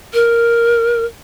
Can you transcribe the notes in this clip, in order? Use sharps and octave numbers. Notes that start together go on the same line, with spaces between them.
A#4